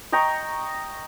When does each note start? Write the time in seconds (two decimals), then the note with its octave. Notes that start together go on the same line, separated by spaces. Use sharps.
0.12 D#5 G5 A#5 C#6